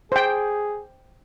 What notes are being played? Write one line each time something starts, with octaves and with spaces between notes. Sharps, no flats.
G#4 C5 G5